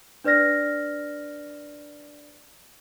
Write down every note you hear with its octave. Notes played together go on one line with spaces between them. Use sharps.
D4 B4 D5 F6 A#6